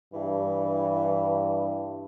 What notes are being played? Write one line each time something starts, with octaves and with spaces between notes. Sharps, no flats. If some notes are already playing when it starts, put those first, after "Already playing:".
G2 E3